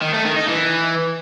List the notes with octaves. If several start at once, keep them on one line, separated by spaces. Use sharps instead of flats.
D#3
A3
D#3
D#4
E3